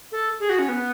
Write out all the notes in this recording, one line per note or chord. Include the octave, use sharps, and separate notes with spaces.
A4
G#4
F#4
C#4
B3